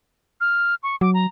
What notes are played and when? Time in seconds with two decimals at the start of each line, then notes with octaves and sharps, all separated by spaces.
0.40 F6
0.83 C#6
1.01 F#3 D6
1.14 A#5